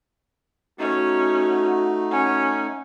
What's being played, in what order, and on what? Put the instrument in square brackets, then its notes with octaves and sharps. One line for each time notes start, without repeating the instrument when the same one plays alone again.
[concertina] A3 D#4 [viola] C#4 [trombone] F#4
[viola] C#4 [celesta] F#5 G#5